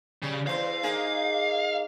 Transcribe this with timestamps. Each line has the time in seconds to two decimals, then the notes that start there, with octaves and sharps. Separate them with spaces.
0.22 C#3 G3
0.47 E2 C5 F5
0.83 A#3 D#4 G#4